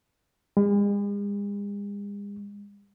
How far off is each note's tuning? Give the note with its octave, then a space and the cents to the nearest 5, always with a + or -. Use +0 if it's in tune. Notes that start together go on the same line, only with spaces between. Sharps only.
G#3 -45